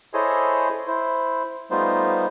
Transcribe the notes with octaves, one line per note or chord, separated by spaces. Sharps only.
E4 G#4 A4 C5 C#5 D#5
E4 C5
G3 A3 B3 D#4 F4 C5